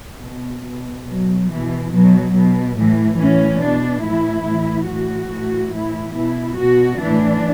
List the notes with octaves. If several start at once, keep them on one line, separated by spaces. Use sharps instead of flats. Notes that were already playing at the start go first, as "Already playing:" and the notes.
B2
B2
B2 F#3
B2 E3
B2 F#3
B2
A2 E3
A2 E3 C#4
B2 D4
A2 E3 E4
A2 E3
A2 E3 F#4
A2 E3
A2 E3 E4
B2 E4
B2 F#4
A2 E3 D4